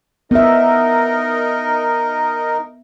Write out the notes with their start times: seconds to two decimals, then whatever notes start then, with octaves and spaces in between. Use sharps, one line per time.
0.31 B3 D#4 A#4 D#5 E5